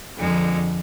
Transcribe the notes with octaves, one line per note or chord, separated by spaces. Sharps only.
F2 D3 F3 G#3